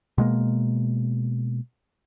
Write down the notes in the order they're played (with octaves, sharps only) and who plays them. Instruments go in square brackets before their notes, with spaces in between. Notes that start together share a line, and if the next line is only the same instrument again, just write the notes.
[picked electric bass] B2 G#3 A#3